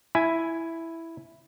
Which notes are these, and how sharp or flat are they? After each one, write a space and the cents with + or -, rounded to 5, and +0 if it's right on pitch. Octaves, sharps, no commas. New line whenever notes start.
E4 +0 G#5 +5